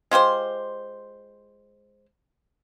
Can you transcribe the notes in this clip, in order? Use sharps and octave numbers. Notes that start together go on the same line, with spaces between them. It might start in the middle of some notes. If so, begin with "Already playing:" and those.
G#3 F4 G4 C5